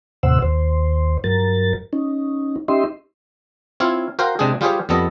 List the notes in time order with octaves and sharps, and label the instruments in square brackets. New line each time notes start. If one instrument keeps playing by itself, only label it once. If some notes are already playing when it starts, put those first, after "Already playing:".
[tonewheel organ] D#2 A2 C3 C5 F#5 E6
D#2 C5
G2 F#3 A#4 A6
C#4 D#4
C#4 D#4 G4 D#5 E5 C6
[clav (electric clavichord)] C4 E4 F4 C#5 F5
F#4 A#4 C5 F5 G5
C3 G#3 D4 G4 G#4
G3 F4 G4 G#4 C5 C#5
F2 G3 B3 A4 D#5